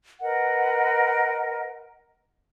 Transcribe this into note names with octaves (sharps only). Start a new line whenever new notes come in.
A#4 B4 D#5 F#5